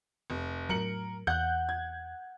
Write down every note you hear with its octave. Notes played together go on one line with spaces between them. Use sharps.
F1
A2 F#3 A#4 C#7 F#7
E2 F#5 F#6 G6
G#6